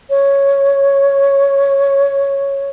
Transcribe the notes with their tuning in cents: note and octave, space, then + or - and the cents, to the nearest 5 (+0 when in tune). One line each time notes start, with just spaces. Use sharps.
C#5 +0